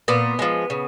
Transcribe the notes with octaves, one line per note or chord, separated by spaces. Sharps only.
A#2 B3
F3 G#3
C#3